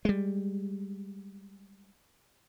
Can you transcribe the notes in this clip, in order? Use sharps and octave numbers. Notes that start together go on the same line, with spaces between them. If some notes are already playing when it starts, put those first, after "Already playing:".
G3 G#3